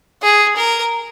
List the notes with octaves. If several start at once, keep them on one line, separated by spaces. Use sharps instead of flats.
G#4
A#4